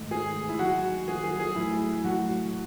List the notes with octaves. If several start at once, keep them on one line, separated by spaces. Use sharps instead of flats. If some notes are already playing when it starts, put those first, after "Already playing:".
Already playing: G#2 D#3 A3
G#2 D#3 A3 G#4
E4
D#2 D#3 F#3 F#4
D#2 D#3 F#3 G#4
G#4
G#4
A2 F#3 A3 E4
A2 F#3 A3 F#4